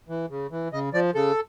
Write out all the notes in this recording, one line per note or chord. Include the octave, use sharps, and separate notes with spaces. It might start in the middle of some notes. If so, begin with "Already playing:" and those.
E3
C#3
E3
C#3 D#5
F3 D5
C#3 A4